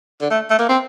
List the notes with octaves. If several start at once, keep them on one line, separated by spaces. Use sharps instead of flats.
D3
A3
A3
A#3
C4